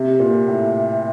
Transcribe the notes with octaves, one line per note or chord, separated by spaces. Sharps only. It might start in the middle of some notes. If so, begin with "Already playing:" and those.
Already playing: C3
A#2
A2